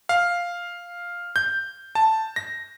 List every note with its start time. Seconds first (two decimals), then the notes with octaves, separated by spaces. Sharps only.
0.09 F5
1.36 G6
1.95 A5
2.36 A#6